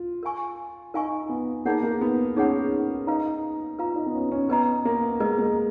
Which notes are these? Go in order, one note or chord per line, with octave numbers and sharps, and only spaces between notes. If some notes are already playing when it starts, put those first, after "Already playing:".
Already playing: F4
A#4 F5 G#5 C#6
D#4 A#4 F5 G#5 C#6
B3
A#3 D#4 G#4 C#5 F#5
A#3
B3
C#4 D#4 G#4 C#5 F#5
D#4 B4 F5 A#5
F4 B4 F5 A#5
D#4
B3
C#4
C#4
B3 B4 D#5 A#5
A#3
G#3 B4 D#5 A#5
A#3